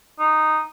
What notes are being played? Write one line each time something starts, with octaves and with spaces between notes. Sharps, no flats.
D#4